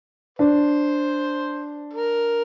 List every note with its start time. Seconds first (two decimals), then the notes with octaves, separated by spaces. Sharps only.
0.39 D4 C5
1.93 A#4